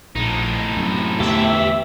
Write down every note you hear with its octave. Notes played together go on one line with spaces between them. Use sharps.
A#1 A2 D#4
F#2 C3
E2 A3 B3 G4 E5